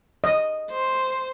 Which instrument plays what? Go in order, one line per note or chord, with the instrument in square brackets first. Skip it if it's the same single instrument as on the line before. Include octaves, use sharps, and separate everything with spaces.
[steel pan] D#5
[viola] C5